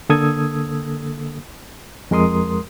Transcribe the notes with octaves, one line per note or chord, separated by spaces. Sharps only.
D3 A#3 A4 D#6 E6 G#6
F2 G#3 A#4 C6 D#6